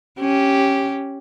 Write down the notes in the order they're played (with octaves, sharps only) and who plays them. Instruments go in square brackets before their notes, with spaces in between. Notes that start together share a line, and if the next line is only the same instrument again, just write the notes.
[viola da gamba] C#4 G4